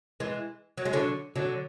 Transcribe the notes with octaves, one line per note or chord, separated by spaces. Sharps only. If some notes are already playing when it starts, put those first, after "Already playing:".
E3 G#3
F#3
G#3
D3 F#3
D3 F#3